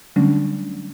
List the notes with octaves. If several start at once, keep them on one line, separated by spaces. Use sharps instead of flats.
D3 F#3 G3 A3 C#4 D4